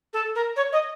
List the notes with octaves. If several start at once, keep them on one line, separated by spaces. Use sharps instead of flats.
A4
A#4
C#5
D#5